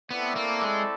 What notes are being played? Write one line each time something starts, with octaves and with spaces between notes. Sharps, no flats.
A3 B3 C4 E4 A4 D5
A#3
G#3